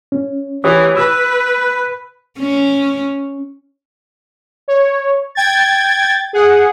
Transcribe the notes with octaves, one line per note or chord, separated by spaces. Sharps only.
C#4
E3 G4 C#5 D#6
B4 E6
C#4
C#5
G5 G#6 A6
G#4 F#5